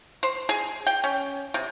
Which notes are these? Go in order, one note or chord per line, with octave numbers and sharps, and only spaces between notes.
C5
G#4
G5
C#4
C3